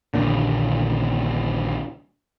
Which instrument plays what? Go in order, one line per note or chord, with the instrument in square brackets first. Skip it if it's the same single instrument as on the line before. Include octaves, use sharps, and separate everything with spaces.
[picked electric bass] A#1 D#2 A#2 D3